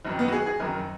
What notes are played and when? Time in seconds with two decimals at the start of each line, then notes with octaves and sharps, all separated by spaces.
0.05 F#1 F#2 D#3
0.19 B3
0.28 F#4
0.32 G#4
0.46 G#4
0.60 F#1 F#2 D#3 A#4